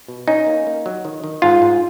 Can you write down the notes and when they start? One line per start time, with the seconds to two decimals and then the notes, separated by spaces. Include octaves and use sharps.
0.08 B2
0.28 C#4 D#4
0.47 A#3
0.67 A#3
0.86 F#3
1.05 D#3
1.24 D#3
1.42 G#2 F4
1.62 G#2